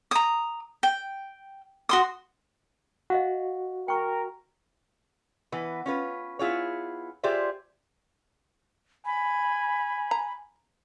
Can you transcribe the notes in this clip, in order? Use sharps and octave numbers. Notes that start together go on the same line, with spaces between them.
A#5 D#6
G5
F#4 C6 D#6
F#4 D#5 F5 F#5
A#4 G5 C#6
E3 B3 B4
C#4 F4 B4
B3 E4 F4 G#4 C#5
F4 G4 G#4 C5 D5 E5
G#5 B5
A#5